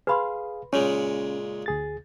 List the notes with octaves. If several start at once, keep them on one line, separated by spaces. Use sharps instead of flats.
G#4 B4 F5 B5 C6
A#2 C#3 G#3 C#4 C#5
D2 G#4 A6